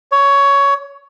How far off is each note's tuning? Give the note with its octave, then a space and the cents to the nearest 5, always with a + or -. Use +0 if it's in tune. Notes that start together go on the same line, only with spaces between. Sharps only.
C#5 +15